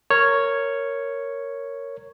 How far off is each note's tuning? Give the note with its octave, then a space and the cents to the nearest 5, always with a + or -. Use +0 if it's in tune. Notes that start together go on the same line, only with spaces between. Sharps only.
A#4 -10 C#5 +0